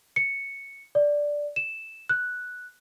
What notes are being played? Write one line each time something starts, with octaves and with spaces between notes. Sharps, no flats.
C#7
D5
E7
F#6